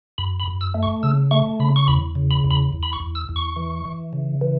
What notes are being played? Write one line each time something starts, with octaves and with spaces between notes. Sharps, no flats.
F#2 B5
B5
F#2
E6
A3
C#6
C#3 E6
A3 C#6
C#3 B5
C#6
E2 B5
C#3
B5
E2
B5
E2
B5
C#6
E2
E6
E2
C#6
E3
E3
C#3
E3